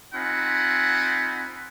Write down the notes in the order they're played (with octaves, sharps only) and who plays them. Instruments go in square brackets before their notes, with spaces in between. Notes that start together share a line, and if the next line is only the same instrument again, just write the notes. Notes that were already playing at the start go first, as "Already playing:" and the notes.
[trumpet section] C4 D#4 F4 F#5 G#5 B5